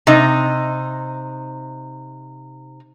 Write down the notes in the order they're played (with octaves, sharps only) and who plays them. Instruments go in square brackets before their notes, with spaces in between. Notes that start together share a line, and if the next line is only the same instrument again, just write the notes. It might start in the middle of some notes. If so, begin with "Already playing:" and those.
[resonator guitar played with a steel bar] C3 D#4